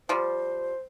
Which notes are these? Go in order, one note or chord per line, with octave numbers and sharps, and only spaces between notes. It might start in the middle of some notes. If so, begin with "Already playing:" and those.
F3 G3 C5